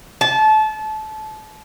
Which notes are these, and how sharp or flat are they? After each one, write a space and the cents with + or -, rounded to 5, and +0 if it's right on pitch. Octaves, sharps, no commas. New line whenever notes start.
A5 -25